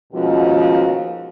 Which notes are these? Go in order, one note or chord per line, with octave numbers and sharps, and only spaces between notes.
D#2 B2 F3 G#3 C#4 F#4